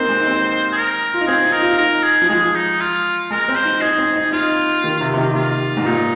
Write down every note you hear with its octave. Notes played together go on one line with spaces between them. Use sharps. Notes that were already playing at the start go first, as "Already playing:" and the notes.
Already playing: A#3 C4 D#4 C5
G#3
D#4
C4
G#4
A#4
F4
D#4
C4 G#4
D#4
A#4
F4
D#4 A#4
G#4
F3
G#3 G#4
D#4
F4
G#3 A#4
C4
C5
D#4
D#4 G#4
C4
D#4
D#4 F4
D#3
C3
C3
D#3
C3 F4
G#2
A#2 D#4